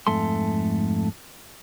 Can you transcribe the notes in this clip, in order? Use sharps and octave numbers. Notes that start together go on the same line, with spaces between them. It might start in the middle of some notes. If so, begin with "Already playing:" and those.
F2 G#2 A3 A4 C6